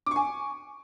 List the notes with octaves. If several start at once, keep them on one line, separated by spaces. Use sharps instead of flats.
G#5 C#6 D6